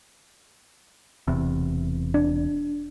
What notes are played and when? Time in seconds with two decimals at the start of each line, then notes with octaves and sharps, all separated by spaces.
1.28 E1 E2 C3
2.14 D4